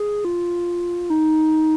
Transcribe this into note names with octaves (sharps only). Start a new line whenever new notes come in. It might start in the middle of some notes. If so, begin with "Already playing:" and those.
Already playing: G#4
F4
D#4